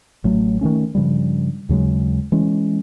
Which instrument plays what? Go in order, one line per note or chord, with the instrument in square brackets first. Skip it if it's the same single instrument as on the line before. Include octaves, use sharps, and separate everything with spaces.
[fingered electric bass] A1 F#3 A3
D#3 E3 A3 C#4
G2 C#3 F3 G3
D#2 C#3 F#3 G#3
E3 G#3 C#4